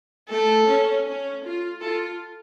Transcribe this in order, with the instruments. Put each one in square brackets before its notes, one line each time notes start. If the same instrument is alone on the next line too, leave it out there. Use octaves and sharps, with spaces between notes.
[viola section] A3 [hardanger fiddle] A4
[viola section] C#4
C#4
F4
[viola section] F4 [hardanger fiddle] A4